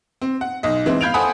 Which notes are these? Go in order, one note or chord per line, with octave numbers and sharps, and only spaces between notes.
C4
F#5
B1 D#5
E3 G#3 C4
F5 B5 G6 G#6 D7 F7
A4 C5 F#5 G#5 B5 D#6